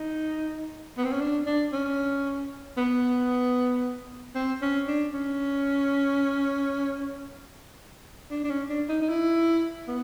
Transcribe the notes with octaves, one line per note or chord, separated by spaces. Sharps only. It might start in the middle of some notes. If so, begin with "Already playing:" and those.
Already playing: D#4
B3
C4
C#4
D4
D4
C#4
B3
C4
C#4
D4
C#4
D4
D4
C#4
D4
D#4
D#4
E4
B3